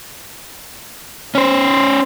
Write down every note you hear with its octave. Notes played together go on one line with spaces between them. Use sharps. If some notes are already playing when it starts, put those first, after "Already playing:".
C#4 C5